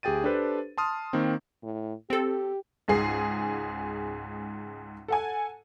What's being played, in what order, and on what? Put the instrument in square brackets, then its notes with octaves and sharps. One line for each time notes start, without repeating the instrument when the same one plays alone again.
[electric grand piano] D2 G4 G#4 G5 A6 D#7
D4 G4 A4 B4 C5
A5 C6 D#6 F6
D#3 A#3 C4
[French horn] A2
[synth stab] C4 A4 [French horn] G4
[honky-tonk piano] C#2 G#2 G#4 C7
A4 F#5 G#5